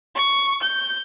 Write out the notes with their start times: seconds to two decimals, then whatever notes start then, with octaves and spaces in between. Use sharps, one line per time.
0.15 C#6
0.61 G6